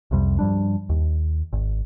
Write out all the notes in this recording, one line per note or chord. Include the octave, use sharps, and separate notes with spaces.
C2 F2 C3 G3
G2 F3 G3 D4
D#2
G#1